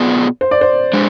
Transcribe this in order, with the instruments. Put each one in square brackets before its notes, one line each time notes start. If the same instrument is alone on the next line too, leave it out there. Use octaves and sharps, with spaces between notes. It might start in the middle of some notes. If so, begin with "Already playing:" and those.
Already playing: [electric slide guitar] B2 B3 F4 G#4 D5
[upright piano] C5
D5
C5
[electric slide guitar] G#3 D4